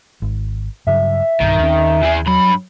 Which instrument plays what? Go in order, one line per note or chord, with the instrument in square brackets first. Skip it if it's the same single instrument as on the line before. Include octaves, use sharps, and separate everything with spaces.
[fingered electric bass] G#1
[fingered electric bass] G2 C#3 F#3 [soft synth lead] E5
[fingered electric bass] B1 G2 [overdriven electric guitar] D#3
[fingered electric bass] D#2 C4 C#4
[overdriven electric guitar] E3 G#4
[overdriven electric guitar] G2 B5 [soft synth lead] F#3